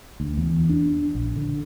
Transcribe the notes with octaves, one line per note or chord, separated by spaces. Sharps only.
D2
E2
D4
A#1
D3